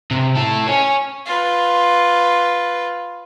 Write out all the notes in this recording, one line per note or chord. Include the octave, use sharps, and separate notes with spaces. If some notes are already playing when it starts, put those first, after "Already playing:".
C3
E4 A4
C#5 G#5
F4 B4